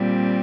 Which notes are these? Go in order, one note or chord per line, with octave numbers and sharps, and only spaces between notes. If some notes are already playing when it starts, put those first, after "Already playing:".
Already playing: A#2 G3 C4